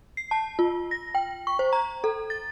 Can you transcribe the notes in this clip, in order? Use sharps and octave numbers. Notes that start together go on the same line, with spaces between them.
C7
A5
F4
A#6
G5
C#6
C5
A#5
A4
A6